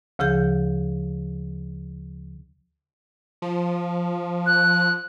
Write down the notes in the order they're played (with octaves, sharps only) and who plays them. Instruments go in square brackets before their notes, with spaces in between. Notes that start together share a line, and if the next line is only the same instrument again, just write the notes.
[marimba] D2 C#3 F3 G#4 G6
[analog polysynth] F3
[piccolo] F#6